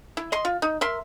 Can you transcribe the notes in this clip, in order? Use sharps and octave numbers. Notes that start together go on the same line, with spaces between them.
E4
D#5 C6
F4
D#4
A#4 E5 C6